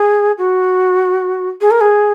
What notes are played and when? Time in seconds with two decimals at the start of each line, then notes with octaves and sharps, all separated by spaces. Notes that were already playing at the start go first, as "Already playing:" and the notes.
Already playing: G#4
0.38 F#4
1.61 G#4
1.71 A#4
1.81 G#4